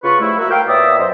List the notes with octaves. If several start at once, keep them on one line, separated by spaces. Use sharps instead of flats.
C#3 B3 F4 B4 C#6
F3 G3 A3 E4
A#3 F#4 E5
A#4 F5 G5
A#2 B3 C#5 D5 E5 D#6
F#2 C5 D#5